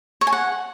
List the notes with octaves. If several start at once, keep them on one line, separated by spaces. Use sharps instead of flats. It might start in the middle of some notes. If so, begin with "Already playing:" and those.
C#5
G#5
F#5